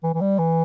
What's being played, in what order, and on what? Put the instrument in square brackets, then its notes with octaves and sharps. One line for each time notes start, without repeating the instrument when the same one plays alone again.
[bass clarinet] E3
E3
G3
E3